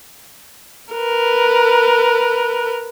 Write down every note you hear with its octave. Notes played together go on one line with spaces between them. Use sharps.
A#4 B4